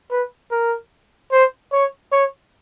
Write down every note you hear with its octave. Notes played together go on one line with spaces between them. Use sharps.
B4
A#4
C5
C#5
C#5